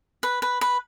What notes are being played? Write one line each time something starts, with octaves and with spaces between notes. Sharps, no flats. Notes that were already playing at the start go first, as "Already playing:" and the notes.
B4
B4
B4